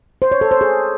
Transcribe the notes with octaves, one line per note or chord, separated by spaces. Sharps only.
C5
C#5
A4
C5
G#4